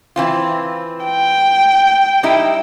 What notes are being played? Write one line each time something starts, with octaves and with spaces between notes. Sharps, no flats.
E3 C4 F4
G5
G3 D#4 E4